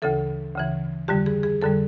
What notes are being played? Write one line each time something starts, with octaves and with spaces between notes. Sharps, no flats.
D2 C#3 E3 A4
D2 C#3 E3
F2 D3 G3 G4
G#4
G#4
F2 D3 G3 A4